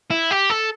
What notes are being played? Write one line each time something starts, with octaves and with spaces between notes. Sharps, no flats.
E4
G4
A4